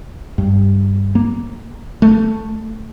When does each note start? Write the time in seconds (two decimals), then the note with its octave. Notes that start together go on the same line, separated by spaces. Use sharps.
0.38 G2
1.15 A#3
2.02 A3